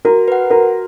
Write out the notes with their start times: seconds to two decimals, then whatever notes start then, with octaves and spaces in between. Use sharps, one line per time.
0.05 F#4 A#4
0.28 B4 F#5
0.50 F#4 A#4